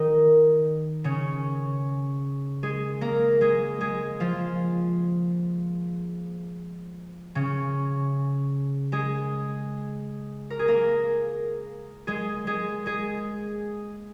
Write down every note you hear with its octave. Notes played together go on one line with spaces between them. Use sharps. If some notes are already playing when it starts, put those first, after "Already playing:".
Already playing: D#3 D#4
C#3 C#4
G#3 G#4
A#3 A#4
G#3 G#4
G#3 G#4
F3 F4
C#3 C#4
G#3 G#4
A#4
G#4
A#3 A#4
G#3 G#4
G#3 G#4
G#3 G#4